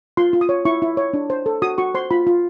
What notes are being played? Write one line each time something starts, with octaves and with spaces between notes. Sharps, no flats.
F4 C6
F4
D#6
C#5
E4 C#6
E4
C#5
D4
C5
A4
F#4 D#6
F#4 C#6
C5 C6
F4 B5
F4